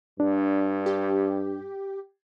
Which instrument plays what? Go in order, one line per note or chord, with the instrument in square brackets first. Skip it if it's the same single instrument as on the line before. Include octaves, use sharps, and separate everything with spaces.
[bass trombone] G2 [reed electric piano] D4
[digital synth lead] G4